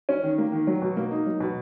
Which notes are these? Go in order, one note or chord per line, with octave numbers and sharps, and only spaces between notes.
C#4
D#3
A#3
D#3
F#3
B2
A#3
D#4
F#3
B2